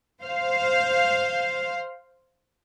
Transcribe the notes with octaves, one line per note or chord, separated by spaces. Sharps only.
C5 F5